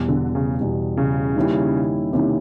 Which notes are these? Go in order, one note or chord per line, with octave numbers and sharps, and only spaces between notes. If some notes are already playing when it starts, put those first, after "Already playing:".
Already playing: E2 B2 G3
D3
C#3
E2 B2 G3
C#3
D#3 G3 A#3 C#4 E4
C3 D#3 G3 A#3 C#4 E4